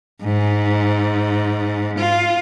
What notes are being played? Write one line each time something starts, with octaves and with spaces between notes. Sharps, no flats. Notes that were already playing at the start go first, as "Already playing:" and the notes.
G#2
F4